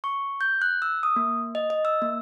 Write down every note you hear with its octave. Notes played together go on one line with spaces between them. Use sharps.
C#6
G6
F#6
E6
D#6
A#3
D#5
D#5
E6
A#3